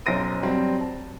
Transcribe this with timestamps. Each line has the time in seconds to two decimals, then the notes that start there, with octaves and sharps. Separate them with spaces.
0.06 B1 F#2 C5 A#6 D7 D#7
0.43 G2 F#3 G3 C4
0.81 A5